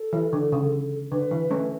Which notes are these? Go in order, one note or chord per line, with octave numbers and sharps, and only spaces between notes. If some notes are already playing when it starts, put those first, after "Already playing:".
Already playing: A4
E3
D3
C#3
D3 B4
E3
A3 C#4